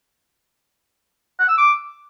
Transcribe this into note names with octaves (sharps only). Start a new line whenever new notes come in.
F#5
E6
D6